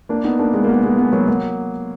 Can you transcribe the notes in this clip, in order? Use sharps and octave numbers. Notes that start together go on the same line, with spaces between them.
A#3 D4
B3 D#4
A#3 D4
G#3 B3
A#3
G#3 B3
G#3 B3
G#3 B3
F#3 A#3
F#3 A#3